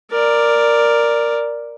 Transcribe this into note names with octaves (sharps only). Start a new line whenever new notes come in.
A#4 D5